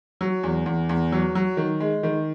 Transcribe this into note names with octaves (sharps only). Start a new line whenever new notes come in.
F#3
E2
E2
E2
F#3
F#3
D#3
G#3
D#3